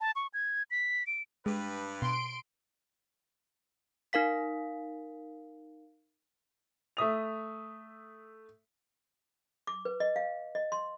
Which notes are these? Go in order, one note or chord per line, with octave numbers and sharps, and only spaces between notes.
A5
C#6
G#6
B6
D7
G2 G#3 B4
B2 C6 D7
D#4 A#4 F5 B6
A3 E5 D#6 F7
D6
B4
D#5
F5
D#5
C6